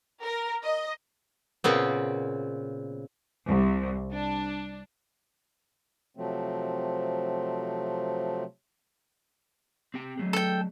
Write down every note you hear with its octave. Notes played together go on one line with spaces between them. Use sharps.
A#4
D#5
A#2 C#3 B3 C4
C2
D4
C3 F3 F#3 A3 C4
C4 G4 G5
F#3 A3 G#4
A4 G5